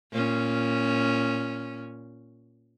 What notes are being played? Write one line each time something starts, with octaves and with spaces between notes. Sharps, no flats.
A#2 C#4